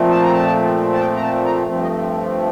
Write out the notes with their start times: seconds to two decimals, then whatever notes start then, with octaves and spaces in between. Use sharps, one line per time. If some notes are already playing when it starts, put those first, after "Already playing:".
Already playing: A#2 F3 A3 C4
0.10 A5
0.22 A#5
0.33 A5
0.93 A5
0.99 G5
1.16 A#5
1.23 A5
1.45 A#5
1.67 G2 F3 A3 C4
1.83 D#5